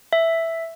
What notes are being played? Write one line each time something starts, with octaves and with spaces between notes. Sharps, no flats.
E5